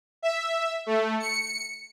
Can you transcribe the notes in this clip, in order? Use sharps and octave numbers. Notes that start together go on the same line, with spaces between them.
E5
A3
C#7